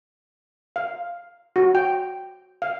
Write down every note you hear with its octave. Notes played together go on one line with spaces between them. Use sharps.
F5
F#4
G5
F5